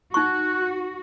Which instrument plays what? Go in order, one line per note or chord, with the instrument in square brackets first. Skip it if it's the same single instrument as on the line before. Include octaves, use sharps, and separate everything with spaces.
[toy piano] D#4 C#6 [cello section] F#4 [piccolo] F#6